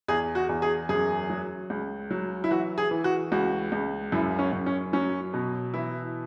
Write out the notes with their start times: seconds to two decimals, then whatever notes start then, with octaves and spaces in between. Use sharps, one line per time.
0.08 E2 G#4
0.35 F#4
0.49 E2
0.62 G#4
0.89 F#2 G#4
1.30 F#3
1.70 C#2
2.11 F#3
2.44 E4
2.51 E3 F#4
2.78 G#4
2.91 E3
3.04 F#4
3.32 C#2 F#4
3.72 C#2
4.12 F#2 E4
4.39 C#4
4.53 F#2
4.66 C#4
4.93 F#3 C#4
5.33 B2
5.74 E3 E4